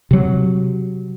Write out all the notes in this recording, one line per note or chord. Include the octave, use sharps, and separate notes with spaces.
C3 F#3